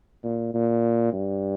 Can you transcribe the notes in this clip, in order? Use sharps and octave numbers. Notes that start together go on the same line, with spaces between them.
A#2
A#2
G2